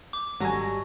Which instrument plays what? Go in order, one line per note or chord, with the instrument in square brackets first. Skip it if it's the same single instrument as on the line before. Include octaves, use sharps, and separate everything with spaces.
[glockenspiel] D6
[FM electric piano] G#1 G3 A#6 [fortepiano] F#3 G#5 [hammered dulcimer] A4 D#5 C#6